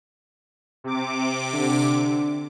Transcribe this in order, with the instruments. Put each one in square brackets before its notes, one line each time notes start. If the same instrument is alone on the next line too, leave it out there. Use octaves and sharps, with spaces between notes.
[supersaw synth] C3 D6
[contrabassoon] D3